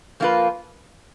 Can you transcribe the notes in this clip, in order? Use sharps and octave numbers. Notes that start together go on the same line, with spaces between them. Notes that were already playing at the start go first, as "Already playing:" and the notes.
F3 A#3 F4 B4